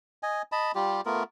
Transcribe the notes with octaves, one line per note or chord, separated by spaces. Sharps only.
D#5 G#5
D#5 A5 B5
G3 F4 G4
A3 B3 F4 A#4